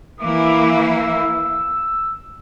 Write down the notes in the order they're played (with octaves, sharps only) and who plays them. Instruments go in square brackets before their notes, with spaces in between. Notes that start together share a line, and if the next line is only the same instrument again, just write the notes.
[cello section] E3 A#3 E4 [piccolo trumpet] D6
[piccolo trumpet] E6